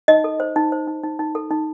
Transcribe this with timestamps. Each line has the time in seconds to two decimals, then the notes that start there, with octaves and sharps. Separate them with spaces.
0.08 D#4 D#5
0.24 A4
0.40 C5
0.56 D#4
0.72 C5
0.88 D#4
1.03 D#4
1.19 D#4
1.35 A4
1.51 D#4